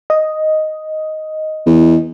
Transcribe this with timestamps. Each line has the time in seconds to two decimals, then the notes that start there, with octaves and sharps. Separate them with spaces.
0.10 D#5
1.66 E2